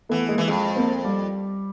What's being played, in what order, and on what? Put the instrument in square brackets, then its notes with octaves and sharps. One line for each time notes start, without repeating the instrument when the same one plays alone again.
[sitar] E3 [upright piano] A3 B3
[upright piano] G#3 A#3
[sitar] E3
[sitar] F2 [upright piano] G#3
[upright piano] A#3 C4
G3